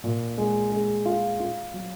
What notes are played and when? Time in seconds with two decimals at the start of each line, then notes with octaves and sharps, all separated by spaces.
0.04 A#2
0.38 G#3
0.72 G#3
1.06 F4
1.40 F4
1.74 F#3